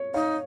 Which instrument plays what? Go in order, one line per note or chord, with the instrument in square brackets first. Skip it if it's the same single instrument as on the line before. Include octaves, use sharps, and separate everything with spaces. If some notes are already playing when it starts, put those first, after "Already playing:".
Already playing: [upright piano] C#5
[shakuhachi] D#4 [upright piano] C#5 F5